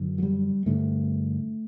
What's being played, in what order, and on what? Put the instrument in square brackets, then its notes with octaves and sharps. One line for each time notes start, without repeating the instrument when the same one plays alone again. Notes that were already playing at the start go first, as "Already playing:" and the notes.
Already playing: [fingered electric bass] F#2 D3
F#3
G3
G2 D3 A3